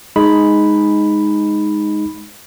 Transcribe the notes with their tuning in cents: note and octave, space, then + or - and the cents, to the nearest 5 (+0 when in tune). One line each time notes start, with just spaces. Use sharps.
G#3 +5 D#4 +0 B5 +0